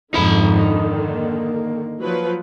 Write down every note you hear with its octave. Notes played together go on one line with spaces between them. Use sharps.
F2 G#2 D3 D#3 D#4 B5
A#3
F3 F#3 B4